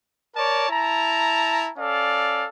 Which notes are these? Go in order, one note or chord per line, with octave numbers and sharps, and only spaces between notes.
A#4 C#5 D5 A5
E4 A5 A#5
C#4 A4 D5 F5